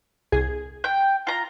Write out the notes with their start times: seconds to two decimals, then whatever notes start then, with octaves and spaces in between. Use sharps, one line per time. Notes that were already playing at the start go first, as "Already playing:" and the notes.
0.32 C2 G#4 G#6
0.84 G5
1.27 F4 A#5